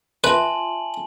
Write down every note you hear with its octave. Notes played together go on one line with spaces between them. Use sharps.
F4 B4 E5 G#5 A5 C6 F#7